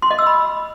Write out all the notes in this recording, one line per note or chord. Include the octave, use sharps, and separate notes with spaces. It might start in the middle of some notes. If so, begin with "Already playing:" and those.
C6
D#5
E6
B5